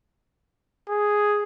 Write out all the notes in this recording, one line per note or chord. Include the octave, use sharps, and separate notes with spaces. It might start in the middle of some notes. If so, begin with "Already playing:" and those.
G#4